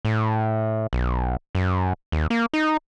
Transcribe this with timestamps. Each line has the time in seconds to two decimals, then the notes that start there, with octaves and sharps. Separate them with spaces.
0.05 A2
0.93 B1
1.55 F#2
2.12 D#2
2.30 A#3
2.54 D#4